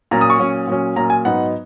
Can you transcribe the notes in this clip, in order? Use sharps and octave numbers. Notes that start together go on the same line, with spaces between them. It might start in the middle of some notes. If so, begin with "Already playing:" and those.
A#2 F#3 C#4 A#5
D#6
C#6
A#2 F#3 C#4
A#2 F#3 C#4
A#2 F#3 C#4 A#5
G#5
G#2 F#3 B3 D#4 F#5